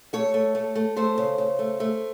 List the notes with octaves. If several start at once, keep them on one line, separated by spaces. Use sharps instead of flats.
A3 C#5
A3
A3
A3
A3 C5
C#3
C#3
A3
A3